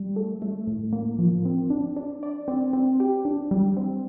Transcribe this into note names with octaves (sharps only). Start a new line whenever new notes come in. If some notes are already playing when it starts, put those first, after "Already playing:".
Already playing: G3
A3
A3
A2
A#3
F3
C4
D4
D4
D5
C4
C4
G4
D4
G3
C4